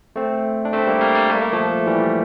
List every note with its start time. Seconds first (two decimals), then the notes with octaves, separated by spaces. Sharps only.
0.16 A3 C4
0.65 D4
0.73 A3 C4
0.87 G3 A#3
1.01 G3 A#3
1.15 G3 A#3
1.30 A3
1.42 A#3
1.53 F3 A3
1.86 E3 G3